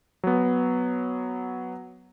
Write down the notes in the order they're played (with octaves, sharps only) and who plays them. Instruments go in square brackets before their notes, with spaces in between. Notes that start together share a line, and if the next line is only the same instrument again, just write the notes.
[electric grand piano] F#3 B3